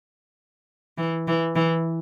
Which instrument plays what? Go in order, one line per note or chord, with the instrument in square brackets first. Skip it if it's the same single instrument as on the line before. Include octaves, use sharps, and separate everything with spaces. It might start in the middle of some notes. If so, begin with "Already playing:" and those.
[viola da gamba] E3
E3
E3